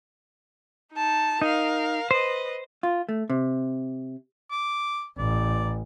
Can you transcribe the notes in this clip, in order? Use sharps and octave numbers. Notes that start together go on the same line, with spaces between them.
D#4 A5
D#4 A#4 F5
B4 C5 D#5
F4
A3
C3
D6
A1 D5